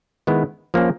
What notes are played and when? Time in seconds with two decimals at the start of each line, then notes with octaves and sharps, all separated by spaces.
0.27 D#3 G#3 B3 E4
0.74 F3 A#3 C#4